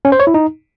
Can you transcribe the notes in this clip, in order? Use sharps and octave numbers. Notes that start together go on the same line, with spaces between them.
C#4
C5
C#5
E4
D#4